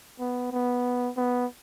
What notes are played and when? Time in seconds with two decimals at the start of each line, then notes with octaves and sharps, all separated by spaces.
0.20 B3
0.52 B3
1.17 B3